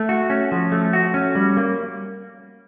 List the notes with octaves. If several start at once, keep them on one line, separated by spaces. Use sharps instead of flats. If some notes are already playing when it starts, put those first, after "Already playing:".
Already playing: A3
F#4
C#4
F3
A3
F#4
C#4
G3
A#3